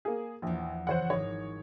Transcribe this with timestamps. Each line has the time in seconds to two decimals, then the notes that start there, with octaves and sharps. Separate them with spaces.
0.05 A#3 G#4
0.42 A#1 E2 F3
0.87 F#1 E3 C5 C#5 F#5
1.10 G#1 D#4 C#5